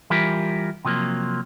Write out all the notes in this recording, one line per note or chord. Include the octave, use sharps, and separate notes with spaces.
E3 G3 F4 G4 A#4
C3 F3 F#3 A#3